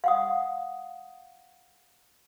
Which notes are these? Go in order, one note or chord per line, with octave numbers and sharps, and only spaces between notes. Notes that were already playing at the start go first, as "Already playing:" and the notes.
F5 F#5 D#6